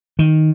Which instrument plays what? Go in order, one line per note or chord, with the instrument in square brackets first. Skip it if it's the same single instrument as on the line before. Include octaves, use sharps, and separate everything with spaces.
[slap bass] D#3